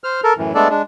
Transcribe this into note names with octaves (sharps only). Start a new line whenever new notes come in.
C5 F6
A4 A#4
F#2 A2 E3
G#3 A3 B3 D4 A4 D5
G#3 D4